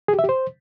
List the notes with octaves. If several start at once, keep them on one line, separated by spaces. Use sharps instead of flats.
G#4
G4
E5
G4
C5